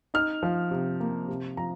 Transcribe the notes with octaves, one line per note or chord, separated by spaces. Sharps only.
D#4 F6
F3
C3
A#3
C3
F3 A#5